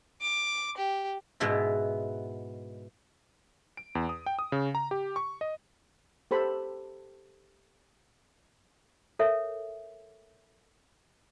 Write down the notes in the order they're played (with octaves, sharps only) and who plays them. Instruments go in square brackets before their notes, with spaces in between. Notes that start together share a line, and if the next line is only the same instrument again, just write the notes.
[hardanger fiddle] D6
G4
[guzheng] G#2 B2 B3 E4
[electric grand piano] D7
E2
D#6
G5
D#6
C#3
A#5
G4
C#6
D#5
[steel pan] G4 A4 C5 B5
[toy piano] A4 A#4 C#5 E5